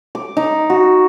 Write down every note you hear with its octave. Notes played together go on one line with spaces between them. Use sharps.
D6
D#4
F#4